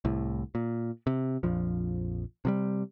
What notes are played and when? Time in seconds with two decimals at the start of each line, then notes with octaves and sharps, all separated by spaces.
0.05 C2 A2
0.55 A#2
1.07 C3
1.43 A#1 F2 F3
2.45 C3 F3 G3